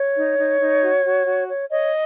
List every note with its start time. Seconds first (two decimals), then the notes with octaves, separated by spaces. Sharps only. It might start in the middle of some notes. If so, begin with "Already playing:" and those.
Already playing: C#5
0.16 D#4
0.37 D#4
0.60 D#4
0.82 F#4
1.05 F#4
1.26 F#4
1.48 C#5
1.70 C#5 D#5